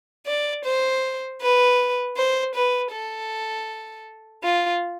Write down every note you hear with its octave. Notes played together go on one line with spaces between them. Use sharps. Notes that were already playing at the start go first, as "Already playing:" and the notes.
D5
C5
B4
C5
B4
A4
F4